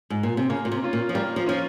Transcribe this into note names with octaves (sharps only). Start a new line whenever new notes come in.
G#2
A#2
C3
C#3 A#3
A#2
C3
C#4 F4
A#2
F3
G3 A#3
F3
F3 C#4 F4